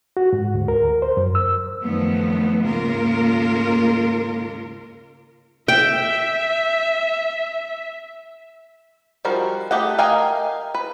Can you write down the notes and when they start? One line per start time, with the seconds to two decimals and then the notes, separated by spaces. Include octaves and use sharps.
0.17 F#4
0.33 G#2
0.55 D2
0.68 A#4
1.02 C5
1.17 F#2
1.35 E6
1.81 F#2 D#3 F3 F#3 A3 B3
2.65 D#2 G#2 C#3 A#3 F4 A#4
5.68 E5 G5
9.25 F3 G3 D#4 F#4 A#4
9.71 A3 G4 D#5 F#5
9.99 A#4 D#5 F5 G5 G#5
10.74 B4